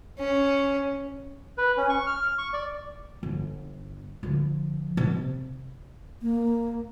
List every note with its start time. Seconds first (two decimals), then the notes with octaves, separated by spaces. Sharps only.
0.19 C#4
1.58 B4
1.77 C#4
1.90 C#6
2.07 F6
2.38 C#6
2.53 D5
3.23 G1
4.23 D3 F3
4.97 C3
6.22 A#3